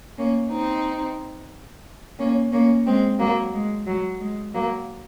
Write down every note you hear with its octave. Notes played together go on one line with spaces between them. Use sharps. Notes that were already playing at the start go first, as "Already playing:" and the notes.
A#3 C#4
C4 D#4
A#3 C#4
A#3 C#4
G#3 C4
F#3 A#3
G#3
F#3
G#3
F#3 A#3